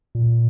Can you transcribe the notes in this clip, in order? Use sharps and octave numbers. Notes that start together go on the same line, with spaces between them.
A#2